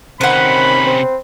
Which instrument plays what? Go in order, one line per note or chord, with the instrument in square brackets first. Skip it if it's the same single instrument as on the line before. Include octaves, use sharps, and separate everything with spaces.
[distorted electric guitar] C3 C#4 [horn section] D#3 B5 [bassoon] C4 [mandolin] B4 F#5
[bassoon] C4